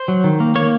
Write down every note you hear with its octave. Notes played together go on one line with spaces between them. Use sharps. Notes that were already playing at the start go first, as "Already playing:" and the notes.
Already playing: C5
F#3
D#3
A#3
A#3 C#5